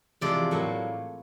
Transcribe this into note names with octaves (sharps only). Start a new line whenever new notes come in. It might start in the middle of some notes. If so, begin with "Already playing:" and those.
E2 C3 F3 G#3 D5
A2 F#3 A#3